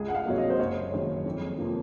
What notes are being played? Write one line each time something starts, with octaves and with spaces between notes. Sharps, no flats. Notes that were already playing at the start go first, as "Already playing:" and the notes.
Already playing: C#2 G#4
F#5
F5
C3 F#3 A#3 C#5
D#5
C5
F#1 C#5
F#2 D#3 G#3
F2
C3 F3 A#3